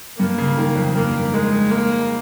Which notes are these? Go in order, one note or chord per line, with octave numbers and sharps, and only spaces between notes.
G2 A#3
C#3
D#3
F2
G2 A#3
G#3
A#3